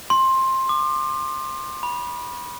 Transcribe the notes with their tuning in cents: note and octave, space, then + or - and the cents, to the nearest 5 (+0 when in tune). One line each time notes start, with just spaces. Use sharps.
C6 +15
D6 +35
B5 -20